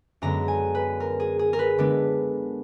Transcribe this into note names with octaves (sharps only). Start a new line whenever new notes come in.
F#2 D3 G#3 B3 A#5
G#5
B4
A#4
G#4
G#4
A#4
B4
D3 G#3 B3 D4